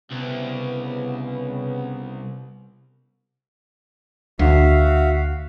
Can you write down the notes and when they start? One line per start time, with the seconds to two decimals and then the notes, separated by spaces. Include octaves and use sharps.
0.11 C2 C#3 B3
4.39 D2 F#4 E5 F5